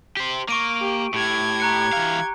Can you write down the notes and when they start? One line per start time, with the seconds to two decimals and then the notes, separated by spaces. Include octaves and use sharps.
0.17 G4 C5
0.49 A#3 C#6 D7 D#7
0.82 G4
1.14 A2 G4 G#6
1.60 A#5 F#6 C#7
1.93 E3 F5